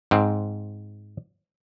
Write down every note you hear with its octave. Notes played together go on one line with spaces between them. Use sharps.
G#2 C4